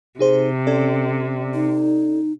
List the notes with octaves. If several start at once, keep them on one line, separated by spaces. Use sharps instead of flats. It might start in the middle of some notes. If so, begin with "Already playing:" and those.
C3 D#4 G#4 C5
C#4 A4 D5
D#4